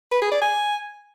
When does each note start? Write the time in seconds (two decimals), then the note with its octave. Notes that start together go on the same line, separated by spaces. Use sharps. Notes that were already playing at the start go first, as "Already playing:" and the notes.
0.12 B4
0.22 G#4
0.31 D5
0.41 G#5